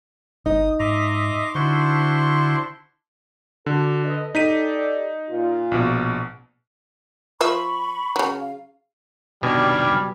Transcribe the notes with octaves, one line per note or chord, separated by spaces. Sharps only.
G1 D#4 D#6
G#2 D#5 E5 A#5 C6 D6
D3 D4 E4 F#4 C5 C6 C#6
D3 D4 F#4 A4
A4 B4 D#5
D#4 G4 A4 D5 B6 D#7
A#2 F4
A#1 B2
F3 F4 E5 B5 C#6
C#3 F#3
F5
C2 B2 D#3 G3 D4 G#5 F6